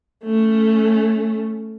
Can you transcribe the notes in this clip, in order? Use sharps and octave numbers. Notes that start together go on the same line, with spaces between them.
A3 C#4